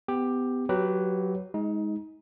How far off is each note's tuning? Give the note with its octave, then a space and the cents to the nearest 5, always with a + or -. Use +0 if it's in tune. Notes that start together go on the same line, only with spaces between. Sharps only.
B3 +30 G4 +10
F#3 +0 G4 -20 B4 +0
G#3 +0 D#4 +25